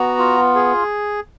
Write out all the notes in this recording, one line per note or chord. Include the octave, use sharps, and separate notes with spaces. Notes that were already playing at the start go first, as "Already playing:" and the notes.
Already playing: B3 F#4 A#5
F4
G#4